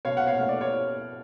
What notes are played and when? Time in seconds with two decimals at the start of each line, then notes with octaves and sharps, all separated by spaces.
0.05 B2 C#5 F5
0.17 F#5
0.27 C#5 F5
0.37 A3
0.49 D5
0.61 C#5